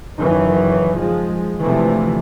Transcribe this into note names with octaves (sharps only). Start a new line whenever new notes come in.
F#1 D#3 E3 F#3
F3 G#3
D2 C3 E3 F3 A3